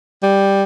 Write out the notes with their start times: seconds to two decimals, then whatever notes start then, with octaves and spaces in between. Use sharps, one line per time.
0.23 G3